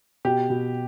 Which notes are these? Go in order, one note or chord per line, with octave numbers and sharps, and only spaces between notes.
B2 G4
B2